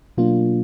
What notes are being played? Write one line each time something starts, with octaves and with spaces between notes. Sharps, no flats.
B2 F#3 A#3 D4 F4